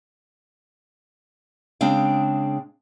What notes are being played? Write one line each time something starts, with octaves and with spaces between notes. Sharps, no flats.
C#3 G#3 C4 D4 F5 G5